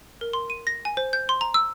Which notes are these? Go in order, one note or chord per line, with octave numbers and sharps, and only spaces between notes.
A#4
C6
D#7
A#6
G#5
C5
G6
C6
A#5
E6